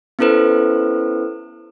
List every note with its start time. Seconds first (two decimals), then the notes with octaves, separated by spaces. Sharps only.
0.19 B3 C#4 E4 A4 B4 C5